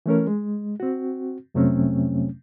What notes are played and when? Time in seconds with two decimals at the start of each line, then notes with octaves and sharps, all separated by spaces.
0.06 E3 A3 C#4 A#4
0.27 G#3
0.80 C4 F#4
1.54 F2 C3 F#3 A3 C4 C#4